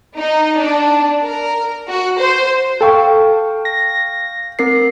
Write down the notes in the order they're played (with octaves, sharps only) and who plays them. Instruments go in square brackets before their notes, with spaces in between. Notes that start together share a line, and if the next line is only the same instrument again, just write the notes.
[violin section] D#4
D4
A#4
F#4
C5
[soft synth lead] A4 [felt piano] F5 G5 C#6
[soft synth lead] A#6
[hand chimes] C4 A#4 C7